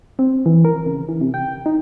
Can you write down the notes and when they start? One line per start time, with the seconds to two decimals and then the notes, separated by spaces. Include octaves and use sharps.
0.19 C4
0.46 E3
0.65 A#4
0.86 C#3
1.09 E3
1.21 C3
1.34 G5
1.66 D#4